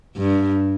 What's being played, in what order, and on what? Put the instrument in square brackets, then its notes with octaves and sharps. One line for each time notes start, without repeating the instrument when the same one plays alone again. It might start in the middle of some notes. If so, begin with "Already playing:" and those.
[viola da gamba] G2